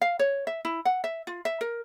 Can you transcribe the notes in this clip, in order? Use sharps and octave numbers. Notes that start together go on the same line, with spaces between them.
F5
C#5
E5
E4
F#5
E5
F4
E5
A#4